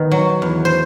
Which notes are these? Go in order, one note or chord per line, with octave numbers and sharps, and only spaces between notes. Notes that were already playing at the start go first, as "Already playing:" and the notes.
Already playing: D#3 B3
F#3
E2
C5